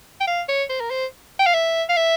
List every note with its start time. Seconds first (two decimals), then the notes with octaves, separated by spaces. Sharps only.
0.21 G5
0.27 F5
0.49 C#5
0.70 C5
0.80 A#4
0.91 C5
1.39 G5
1.47 F5
1.54 E5
1.89 F5
1.96 E5